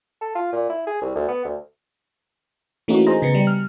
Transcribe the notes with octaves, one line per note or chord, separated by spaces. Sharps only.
A4
F4
A#2
E4
G#4
C2
D2
B3
D2
E3 A3 A#3 C#4 D#4 F#4
G#4 C5 D#5 A#5
C#3 B3 C#7
G3
F6